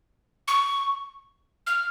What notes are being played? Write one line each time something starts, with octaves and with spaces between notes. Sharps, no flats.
C#6
F6